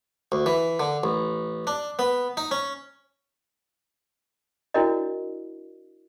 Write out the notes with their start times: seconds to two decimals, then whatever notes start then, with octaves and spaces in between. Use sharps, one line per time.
0.32 D2
0.46 E3
0.80 D3
1.03 A1
1.67 D4
1.99 B3
2.37 D#4
2.51 C#4
4.74 D4 E4 F#4 A#4 D5 D#5